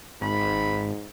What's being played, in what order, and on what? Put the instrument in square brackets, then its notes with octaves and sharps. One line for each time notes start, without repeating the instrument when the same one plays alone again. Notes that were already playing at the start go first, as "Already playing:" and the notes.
[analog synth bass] G#1 [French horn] G#2 [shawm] B5